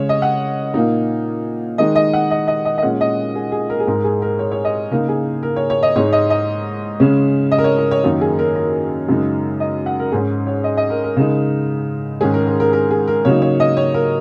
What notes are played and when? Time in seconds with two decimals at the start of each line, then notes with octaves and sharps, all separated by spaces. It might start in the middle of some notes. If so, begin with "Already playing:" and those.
Already playing: C#3 G#3 C#4 C#5
0.09 D#5
0.22 F#5
0.74 A#2 A#3 D#4
1.78 D#3 G#3 D#4 D#5
1.96 D#5
2.13 F#5
2.31 D#5
2.48 D#5
2.65 D#5
2.78 D#5
2.83 A#2 G#3 C#4 F#5
3.01 D#5
3.35 G#4
3.52 G#4
3.70 A#4
3.80 G#4
3.87 G#2 G#3 D#4 A#4
4.04 G#4
4.22 A#4
4.39 C#5
4.52 C#5
4.65 D#5
4.91 C#3 A#3 D#4 A#4
5.09 G#4
5.43 A#4
5.56 C#5
5.70 C#5
5.83 D#5
5.96 G#2 G#3 D#4 C#5
6.13 D#5
6.30 D#5
7.00 C#3 G#3 C#4
7.51 D#5
7.58 A#4
7.64 C#5
7.78 A#4
7.91 C#5
8.04 F#2 D#3 A#3 D#4
8.21 G#4
8.39 A#4
8.56 A#4
9.08 F#2 C#3 G#3 D#4
9.60 D#5
9.86 F#5
10.00 A#4
10.12 G#2 G#3 C#4 G#4
10.47 C#5
10.64 D#5
10.77 D#5
10.90 A#4
11.04 A#4
11.16 C#3 G#3 D#4
12.21 G#2 D#3 G#3 C#4 G#4
12.34 A#4
12.47 A#4
12.60 A#4
12.73 A#4
12.90 G#4
13.08 A#4
13.25 C#3 F#3 A#3 D#4 C#5
13.42 C#5
13.60 D#5
13.77 C#5
13.94 A#4